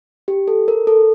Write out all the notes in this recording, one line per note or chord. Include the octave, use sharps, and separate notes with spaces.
G4
A4
A#4
A4